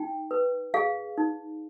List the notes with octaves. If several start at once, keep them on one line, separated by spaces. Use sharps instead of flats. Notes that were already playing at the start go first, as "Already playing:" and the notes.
Already playing: D#4 G5
B4
G#4 F5
D#4